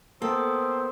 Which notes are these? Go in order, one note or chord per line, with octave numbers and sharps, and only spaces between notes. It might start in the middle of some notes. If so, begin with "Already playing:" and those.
A#3 B3 A4 C5 G5 D#6 E6